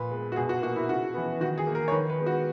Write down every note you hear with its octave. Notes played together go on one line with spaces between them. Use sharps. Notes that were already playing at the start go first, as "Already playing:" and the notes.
Already playing: A#2 B4
G#3 B3
F#4
B2 G#4
F#4
A#3 F#4
E4
C#3 F#4
E3 B3
D#3 F#4
G#4
A#3
A#4
C#5
D#3 B4
B4
G#3 B3
F#4